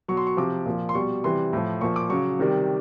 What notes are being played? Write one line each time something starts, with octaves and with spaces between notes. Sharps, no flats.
B2 F#3 C#6
C6
C#6
C3 F3 D6
A#2 F3
C6
B2 G3 C#6
C3 E3 G3 C6
A2 F3
A#2 F3 C#6
D6
C#3 F#3 C#6
C3 D#3 G3